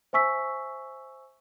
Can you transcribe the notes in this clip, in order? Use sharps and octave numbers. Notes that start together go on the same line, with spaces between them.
C5 E5 G#5 C#6 E6 B6